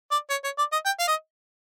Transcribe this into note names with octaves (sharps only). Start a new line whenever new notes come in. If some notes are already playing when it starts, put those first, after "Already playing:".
D5
C#5
C#5
D5
D#5
G5
F5
D#5